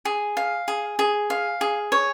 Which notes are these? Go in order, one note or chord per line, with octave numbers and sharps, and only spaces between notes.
G#4
F5
G#4
G#4
F5
G#4
C#5